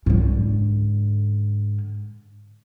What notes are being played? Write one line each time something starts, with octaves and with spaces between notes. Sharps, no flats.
G#2 D3